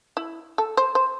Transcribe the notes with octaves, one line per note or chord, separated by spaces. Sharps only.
E4
A4
C5
C5